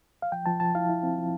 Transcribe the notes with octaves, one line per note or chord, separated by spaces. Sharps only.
F5
F3 G5
F3 A5
F3 A5
E4 F5
E4
C4
F3